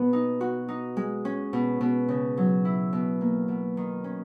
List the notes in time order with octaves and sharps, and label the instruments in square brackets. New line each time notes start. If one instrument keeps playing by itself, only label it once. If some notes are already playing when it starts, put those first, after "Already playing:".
Already playing: [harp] B2 B3
D#4
F#4
D#4
G#3
C#4
B2
B2
C#3
F#3
E4
B2
A#3
B2
D#3
C#4